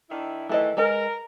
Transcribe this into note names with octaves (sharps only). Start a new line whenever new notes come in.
D#3 D4 E4
D#3 E3 A3 A4 D#5
G#3 A#4 B4 D#5